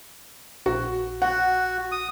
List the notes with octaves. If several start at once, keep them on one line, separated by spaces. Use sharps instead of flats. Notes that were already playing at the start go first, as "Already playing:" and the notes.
A#1 F#4
F#4 F#5
D#6